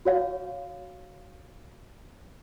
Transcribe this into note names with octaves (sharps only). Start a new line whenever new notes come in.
F#4 C#5 F5